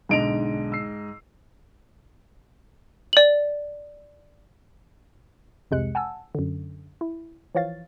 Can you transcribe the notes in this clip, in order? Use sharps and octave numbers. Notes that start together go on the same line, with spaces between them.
B1 G#2 D3 D#5 D7 F7
E6 C7
D5 F#7
C2 F2 C3 G#3 F#6 C#7
F#5 G#5 A5 E6
F#2 D3
E4
E3 F3 C#5 F5 A6